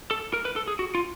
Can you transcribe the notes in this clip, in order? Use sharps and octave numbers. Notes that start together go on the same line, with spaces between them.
A4
A#4
B4
A4
G#4
F#4
F4